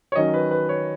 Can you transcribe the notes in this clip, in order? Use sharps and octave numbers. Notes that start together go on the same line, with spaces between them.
C#5
D#3 F#3 C#4 D#5
B4
B4
C#5